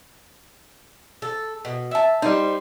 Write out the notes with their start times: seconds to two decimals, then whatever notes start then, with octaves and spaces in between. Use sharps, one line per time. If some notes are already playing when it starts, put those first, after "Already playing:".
1.22 A4
1.65 B2
1.91 E5 A5
2.22 G3 D#4 C5